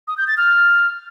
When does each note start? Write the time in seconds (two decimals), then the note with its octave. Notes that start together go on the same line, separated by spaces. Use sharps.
0.08 D#6
0.18 G6
0.27 A6
0.37 F6